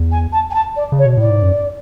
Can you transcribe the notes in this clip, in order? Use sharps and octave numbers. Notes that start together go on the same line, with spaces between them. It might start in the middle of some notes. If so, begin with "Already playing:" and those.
Already playing: E2
G#5
A5
G#5
A5
D5
C#3
C#5
B2
A2 D5
G#2
F#2